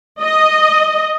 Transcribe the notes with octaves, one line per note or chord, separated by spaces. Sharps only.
D#5